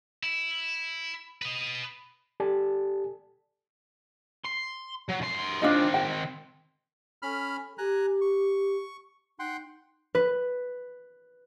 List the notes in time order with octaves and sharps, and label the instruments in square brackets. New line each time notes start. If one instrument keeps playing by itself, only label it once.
[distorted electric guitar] E4
B4 D#5
[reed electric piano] G4 A4 D5 G#5 A5
[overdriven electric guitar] C6
F#3
F#2 C6
[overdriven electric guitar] D#3 C4 [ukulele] D4 F4 D#5
[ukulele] G5
[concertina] C#4 B5 F6 [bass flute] A4
[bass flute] G4 [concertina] G#5 A#5 F#6
[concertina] C#6
[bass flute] D#4 [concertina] F#5 G5 C6
[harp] B4